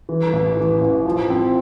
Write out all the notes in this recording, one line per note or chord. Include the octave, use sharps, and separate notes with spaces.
E3
A1
E3
A1
F3
C4